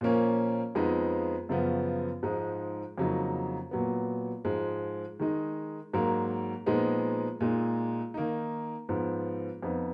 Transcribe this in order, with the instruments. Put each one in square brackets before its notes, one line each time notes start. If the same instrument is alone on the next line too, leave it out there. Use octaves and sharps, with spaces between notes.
[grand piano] A#2 F3 A#3 C#4
F2 F3 G#3 B3 D#4
F#2 C#3 F3 B3
G#2 F3 G#3 D#4
F2 C#3 F#3 A#3 D#4
A#2 F#3 B3
G#2 F3 G#3
D#3 G#3 D#4
G#2 F#3 A#3
A#2 F3 G#3 B3 D#4
A#2 G#3 D#4
D#3 A#3 D#4
G#2 F3 B3
F2 F3 B3 D#4